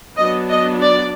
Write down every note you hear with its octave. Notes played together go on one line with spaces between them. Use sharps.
F#3 B3 D4 D#5
D#5
D5